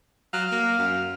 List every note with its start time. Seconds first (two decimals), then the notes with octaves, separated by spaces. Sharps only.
0.33 F#3 F5
0.52 A#3
0.78 F#2